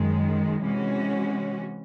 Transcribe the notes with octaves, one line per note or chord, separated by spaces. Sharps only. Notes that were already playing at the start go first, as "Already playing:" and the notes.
Already playing: F#2 D#3 G#3
C3 E3 G#3 C#4 F#4